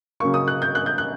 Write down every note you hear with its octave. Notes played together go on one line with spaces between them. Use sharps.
C#3 F#3 A#3 C#6
D#6
F#6
G6
F#6
G6
F#6